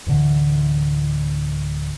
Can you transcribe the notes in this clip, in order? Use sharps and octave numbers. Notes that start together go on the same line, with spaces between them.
D1 A2 D3 E3